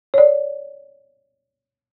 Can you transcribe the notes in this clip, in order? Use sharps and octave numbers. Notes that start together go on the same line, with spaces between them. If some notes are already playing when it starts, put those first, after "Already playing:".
C#5 D5